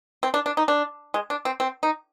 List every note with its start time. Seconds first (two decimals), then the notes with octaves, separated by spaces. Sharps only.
0.23 C4
0.34 D4
0.46 D4
0.57 D#4
0.68 D4
1.14 G#3
1.30 D4
1.45 C4
1.60 C4
1.83 D#4